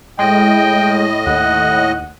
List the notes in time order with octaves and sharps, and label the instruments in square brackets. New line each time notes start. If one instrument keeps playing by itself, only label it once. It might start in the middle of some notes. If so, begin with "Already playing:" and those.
[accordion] A2 D#5 [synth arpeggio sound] G#3 [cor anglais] G5
[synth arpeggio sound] D#2 [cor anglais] F#5